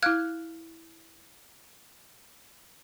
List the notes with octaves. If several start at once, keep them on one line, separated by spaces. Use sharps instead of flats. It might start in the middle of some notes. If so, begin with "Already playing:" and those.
E4 F5 F6 F#6 G#6